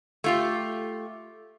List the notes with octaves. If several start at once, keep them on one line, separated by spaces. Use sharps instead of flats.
A3 F4 G4